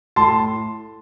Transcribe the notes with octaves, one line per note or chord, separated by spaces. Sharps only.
A2 A5 C6